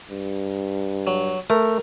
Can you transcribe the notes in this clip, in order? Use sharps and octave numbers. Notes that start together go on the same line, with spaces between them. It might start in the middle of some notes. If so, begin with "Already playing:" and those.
G2
F#3
A3 A#4